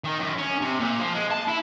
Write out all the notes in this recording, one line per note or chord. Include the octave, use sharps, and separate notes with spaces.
D#3
F#2
C#4
C3
A#2
F3
G#3
A5
E4